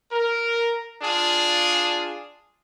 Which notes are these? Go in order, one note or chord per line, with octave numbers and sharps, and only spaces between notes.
A#4
D4 F4 G#4